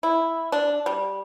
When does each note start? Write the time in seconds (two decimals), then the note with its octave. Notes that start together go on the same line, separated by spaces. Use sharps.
0.03 E4
0.52 D4
0.86 G3